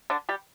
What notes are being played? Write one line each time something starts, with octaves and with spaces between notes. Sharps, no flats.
D3 D4
G3 G4